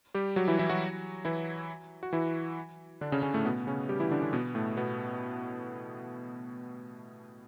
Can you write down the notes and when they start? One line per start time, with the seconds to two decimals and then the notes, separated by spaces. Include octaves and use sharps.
0.14 G3 G4
0.36 F#3 F#4
0.48 E3 E4
0.59 E3 E4
0.70 F#3 F#4
1.25 E3 E4
2.03 F#4
2.13 E3 E4
3.01 D3 D4
3.12 C#3 C#4
3.23 C#3 C#4
3.34 A2 A3
3.45 B2 B3
3.67 C#3 C#4
3.89 G3 G4
4.00 E3 E4
4.11 D3 D4
4.22 D3 D4
4.33 B2 B3
4.55 A2 A3
4.77 B2 B3